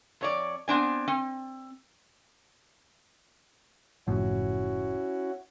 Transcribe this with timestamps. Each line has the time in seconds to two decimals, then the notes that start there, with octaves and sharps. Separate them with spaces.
0.21 F2 C#5 D5
0.68 B3 C4 D4 G#5
1.08 C4
4.08 F#1 A2 F3 C#4 E4 F#4